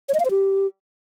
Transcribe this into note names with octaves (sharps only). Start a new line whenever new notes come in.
C#5
D#5
F5
C5
G4